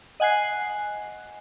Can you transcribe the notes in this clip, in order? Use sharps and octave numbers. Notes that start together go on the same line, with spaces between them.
D#5 F#5 G#5 F#6 C7